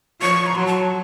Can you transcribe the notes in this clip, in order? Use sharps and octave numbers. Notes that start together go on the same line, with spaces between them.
F3 C#6
A#5
F#3 C6
A5